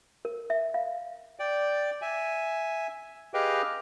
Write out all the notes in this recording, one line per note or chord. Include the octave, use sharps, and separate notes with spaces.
A#4
E5
F5
D5 G5
E5 G#5
G4 G#4 B4 D#5 F5 G5